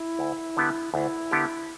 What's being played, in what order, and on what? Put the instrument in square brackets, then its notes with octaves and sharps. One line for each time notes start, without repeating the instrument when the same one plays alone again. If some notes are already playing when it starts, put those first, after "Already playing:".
Already playing: [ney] E4
[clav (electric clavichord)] D2
D3 B3 G4
[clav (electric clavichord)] D2 [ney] E4
[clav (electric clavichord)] D3 B3 G4